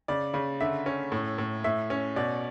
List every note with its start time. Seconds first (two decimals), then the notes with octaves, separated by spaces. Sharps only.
0.08 C#3 D5
0.34 C#3
0.60 D3 E5
0.86 C#4
1.12 A2
1.38 A2
1.64 A2 E5
1.90 C#4
2.16 B2 D5